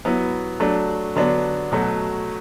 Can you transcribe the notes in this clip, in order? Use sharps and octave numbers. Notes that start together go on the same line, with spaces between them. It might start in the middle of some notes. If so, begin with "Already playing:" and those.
F#3 B3 E4
F#3 A3 D4
D3 F#3 B3 D4
B2 F#3 A3